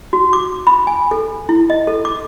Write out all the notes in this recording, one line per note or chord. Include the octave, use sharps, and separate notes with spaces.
F#4
D6
B5
G#5
A4
E4
D#5
A4
D6